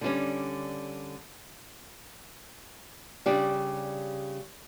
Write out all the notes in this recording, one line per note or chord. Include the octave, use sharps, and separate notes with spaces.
D3 G3 C#4
C#3 G3 D4 G4